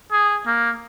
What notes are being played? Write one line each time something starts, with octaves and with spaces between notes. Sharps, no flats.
G#4
A#3